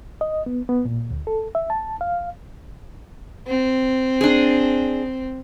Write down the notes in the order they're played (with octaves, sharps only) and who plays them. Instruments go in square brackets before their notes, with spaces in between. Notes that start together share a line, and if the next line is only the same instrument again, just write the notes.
[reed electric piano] D#5
B3
B3
A#2
D2
A4
E5
A5
F5
[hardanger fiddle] C4
[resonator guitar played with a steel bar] D4 G#4